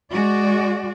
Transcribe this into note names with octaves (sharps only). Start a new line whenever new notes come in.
G#3 F#4 D5